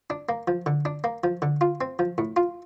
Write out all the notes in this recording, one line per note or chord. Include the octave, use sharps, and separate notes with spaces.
D4
A#3
F3
D3
D4
A#3
F3
D3
F4
C4
F3
A2
F4